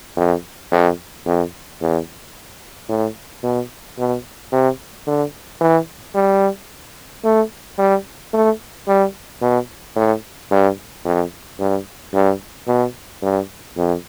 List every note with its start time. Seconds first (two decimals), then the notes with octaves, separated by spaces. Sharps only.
0.17 F2
0.72 F2
1.26 F2
1.81 E2
2.89 A2
3.43 B2
3.98 B2
4.52 C3
5.07 D3
5.61 E3
6.15 G3
7.25 A3
7.79 G3
8.34 A3
8.88 G3
9.42 B2
9.96 A2
10.51 G2
11.05 F2
11.60 G2
12.14 G2
12.68 B2
13.22 G2
13.77 F2